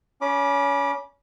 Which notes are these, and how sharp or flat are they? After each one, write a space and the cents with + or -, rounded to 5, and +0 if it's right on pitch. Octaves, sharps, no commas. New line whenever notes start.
C#4 +25 B5 -35 D6 +10